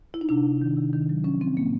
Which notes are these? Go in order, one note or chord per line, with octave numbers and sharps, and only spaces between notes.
E4
D#4
C3 D4
C3
D#3
C3
D#3
F#3
F3 C#4
F3 C4
A2 A#3